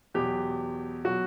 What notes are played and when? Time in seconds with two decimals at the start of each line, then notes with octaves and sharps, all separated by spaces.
0.14 E2 B2 F#3 G4
1.04 B2 F#3 F#4